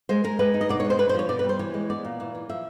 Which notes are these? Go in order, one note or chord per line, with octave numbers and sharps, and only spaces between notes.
G#3 C5
G#3 A#4
G#3 B4
D#4
D#5
B2 D5
C#5
G#3
C5
D4 B4
C5
F3 C#5
B2 D5
B4
G3
C5
E3 C#5
G#3
B3 D5
A#2
E3
E3
F3 E5